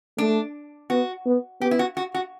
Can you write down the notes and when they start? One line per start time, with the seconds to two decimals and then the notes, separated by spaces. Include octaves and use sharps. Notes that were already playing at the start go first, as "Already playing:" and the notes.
0.18 A3 D4
0.90 B3 F#4
1.26 B3
1.61 B3 G4
1.71 E4
1.79 F#4
1.97 F#4
2.14 F#4